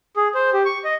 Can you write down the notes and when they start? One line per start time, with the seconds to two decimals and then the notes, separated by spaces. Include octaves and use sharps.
0.17 G#4
0.35 C5
0.53 G4
0.66 C#6
0.84 D#5